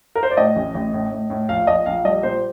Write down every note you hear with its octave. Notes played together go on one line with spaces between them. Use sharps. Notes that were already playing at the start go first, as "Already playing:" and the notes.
A#4
C5
D5
A2 D#5
A1
A1
A2
A2
A2
A#1 F5
A#1 D#5
A#1 F5
G3 D#5
A#2 C5